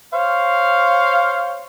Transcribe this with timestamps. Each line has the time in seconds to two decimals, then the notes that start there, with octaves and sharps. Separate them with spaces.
0.12 C5 C#5 F5